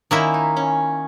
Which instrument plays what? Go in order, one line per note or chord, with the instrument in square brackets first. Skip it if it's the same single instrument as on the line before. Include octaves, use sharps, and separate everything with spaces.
[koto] D#3 A#3 E4 [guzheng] C#4
[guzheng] D#4
C#4